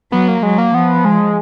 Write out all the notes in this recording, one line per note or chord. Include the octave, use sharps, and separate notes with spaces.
F#3 B3
A#3
F#3 G#3
A#3
F3 B3
G#3